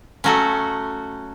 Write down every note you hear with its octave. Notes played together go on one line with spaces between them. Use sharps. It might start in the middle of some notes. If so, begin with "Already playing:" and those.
F#3 A3 C#4 F#4 A4